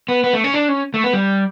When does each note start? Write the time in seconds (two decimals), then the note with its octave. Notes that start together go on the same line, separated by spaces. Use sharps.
0.09 B3
0.24 B3
0.34 A3
0.44 C#4
0.54 D4
0.68 C#4
0.94 A3
1.04 B3
1.13 G3